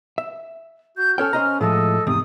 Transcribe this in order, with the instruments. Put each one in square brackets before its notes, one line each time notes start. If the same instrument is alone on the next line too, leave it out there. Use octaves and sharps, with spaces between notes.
[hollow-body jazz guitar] E5
[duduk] F#4 [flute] G6
[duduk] C#4 [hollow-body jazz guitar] A4 C#5 G5 [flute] F6
[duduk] C#4 [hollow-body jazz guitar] C5 D#5 A#5
[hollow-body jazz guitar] A2 F3 G#3 [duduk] A4 [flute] D#5
[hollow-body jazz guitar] E2 G#2 C3 [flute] D#6